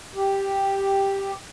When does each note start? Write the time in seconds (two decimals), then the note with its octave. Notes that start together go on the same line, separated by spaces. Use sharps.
0.15 G4